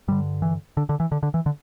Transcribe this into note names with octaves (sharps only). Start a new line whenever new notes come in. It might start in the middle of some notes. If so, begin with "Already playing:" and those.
G2 D3 G3
E3
D3
D3
E3
D3
D3
E3
D3